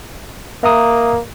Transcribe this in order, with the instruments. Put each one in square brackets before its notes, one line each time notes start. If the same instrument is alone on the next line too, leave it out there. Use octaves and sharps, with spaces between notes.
[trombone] A#3 [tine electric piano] E5 A#5 D#6